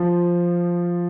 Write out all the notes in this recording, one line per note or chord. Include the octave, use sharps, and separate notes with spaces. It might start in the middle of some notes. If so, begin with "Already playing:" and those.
Already playing: F3